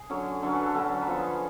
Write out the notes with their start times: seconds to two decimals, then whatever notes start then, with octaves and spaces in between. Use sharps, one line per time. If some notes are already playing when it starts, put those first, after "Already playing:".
Already playing: G#4
0.10 D3 F#3 C#4
0.42 D3 F#3 C#4 A4
0.53 B4
0.63 A4
0.75 D3 F#3 C#4
1.02 B4
1.07 F3 B3 A4
1.19 G#4